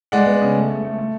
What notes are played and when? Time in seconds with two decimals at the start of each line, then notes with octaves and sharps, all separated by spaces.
0.12 G#3 D5 F#5
0.26 B3
0.42 C#3
0.55 A3
0.70 A3
0.85 A3
0.98 A3